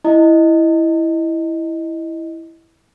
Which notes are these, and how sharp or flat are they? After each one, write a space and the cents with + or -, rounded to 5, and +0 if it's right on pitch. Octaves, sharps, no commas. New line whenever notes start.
E4 +0 D#5 +0 A#5 -45